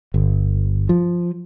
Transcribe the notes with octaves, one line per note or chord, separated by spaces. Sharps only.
G1
F3